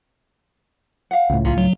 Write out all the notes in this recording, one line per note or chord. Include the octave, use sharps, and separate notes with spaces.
F5 F#5
C#2 A2
B1 C#4 F4
F#3